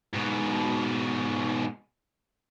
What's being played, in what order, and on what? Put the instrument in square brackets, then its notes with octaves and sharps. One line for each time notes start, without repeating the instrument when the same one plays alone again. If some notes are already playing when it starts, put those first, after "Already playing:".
[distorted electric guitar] G#2 B2